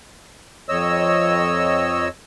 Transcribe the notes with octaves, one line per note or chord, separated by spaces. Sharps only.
F2 C#5 D#5 E6